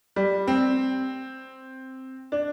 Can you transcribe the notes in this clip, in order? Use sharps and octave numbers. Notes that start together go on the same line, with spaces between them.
G3
C4
D4